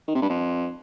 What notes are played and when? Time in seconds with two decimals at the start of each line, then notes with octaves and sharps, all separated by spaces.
0.08 D#3
0.15 C3
0.22 G2
0.29 F2